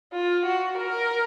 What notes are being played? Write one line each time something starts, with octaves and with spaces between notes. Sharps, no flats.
F4
F#4
A#4